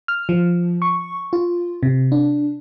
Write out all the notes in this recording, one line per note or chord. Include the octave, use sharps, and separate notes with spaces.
F6
F3
C#6
F4
C3
D4